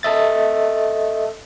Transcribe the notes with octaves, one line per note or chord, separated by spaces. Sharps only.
A4 D#5 E5 A6